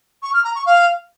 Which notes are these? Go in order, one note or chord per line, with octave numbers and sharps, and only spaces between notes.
C#6
F6
A#5
C#6
F5